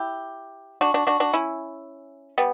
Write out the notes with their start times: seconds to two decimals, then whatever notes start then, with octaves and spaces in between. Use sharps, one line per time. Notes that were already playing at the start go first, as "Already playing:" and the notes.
Already playing: E4 G4
0.81 D4 F#4
0.94 D4 F#4
1.07 D4 F#4
1.20 D4 F#4
1.33 C#4 E4
2.38 G3 B3